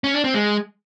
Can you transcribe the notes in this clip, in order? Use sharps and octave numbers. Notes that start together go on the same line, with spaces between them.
C#4
D4
C4
G#3